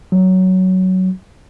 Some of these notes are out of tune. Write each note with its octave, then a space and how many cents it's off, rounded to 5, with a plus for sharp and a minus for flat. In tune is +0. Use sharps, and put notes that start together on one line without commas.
F#3 +10